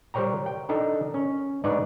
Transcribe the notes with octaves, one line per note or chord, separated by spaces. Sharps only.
G3 A#4 C5 C#5 G5 A#5
G5
D4 D#4 A4 A#4
C#4
G#2 D4 D#4 B4 C#5 D5